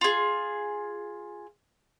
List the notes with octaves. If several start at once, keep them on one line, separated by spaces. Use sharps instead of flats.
F4 G#4